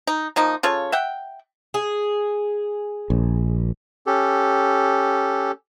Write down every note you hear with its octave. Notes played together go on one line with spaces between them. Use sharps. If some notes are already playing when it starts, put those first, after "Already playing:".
D#4
F3 A#3 D#4
C#3 F4 A4 C#5
E5 F#5 G5
G#4
A#1
C#4 G4 A4